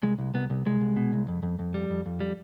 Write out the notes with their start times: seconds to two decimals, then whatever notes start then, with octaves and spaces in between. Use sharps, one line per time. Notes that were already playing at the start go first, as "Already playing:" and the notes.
0.03 C2 G#3
0.19 C2
0.34 C2 B3
0.50 C2
0.66 C2 G#3
0.81 C2
0.96 B2
1.13 C2
1.28 F2
1.43 F2
1.59 F2
1.74 G3
1.90 F2
2.06 F2
2.20 G3